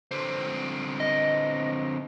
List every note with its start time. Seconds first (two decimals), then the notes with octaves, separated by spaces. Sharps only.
0.11 D3 C4
1.00 D#5